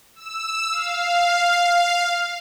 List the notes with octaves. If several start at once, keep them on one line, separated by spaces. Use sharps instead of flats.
E6
F5